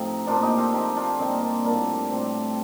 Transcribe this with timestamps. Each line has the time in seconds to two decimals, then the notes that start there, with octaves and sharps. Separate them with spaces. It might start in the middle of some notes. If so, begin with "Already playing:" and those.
Already playing: A2 C3 F3 C4 D#4
0.27 A#2 F3 D4 F4
0.42 D#4 G4
0.58 F4 A4
0.73 C3 F3 D#4 G4
0.96 D4 F4
1.19 A#2 G3 C4 D#4
1.42 A#3 D4
1.65 A2 G3 A#3 D4
2.11 A2 G3 A3 C4